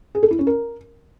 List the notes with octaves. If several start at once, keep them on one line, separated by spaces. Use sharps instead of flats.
G#4
A4
E4
C#4
A#4